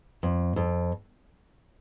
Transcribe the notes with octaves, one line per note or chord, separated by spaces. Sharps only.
F2
F2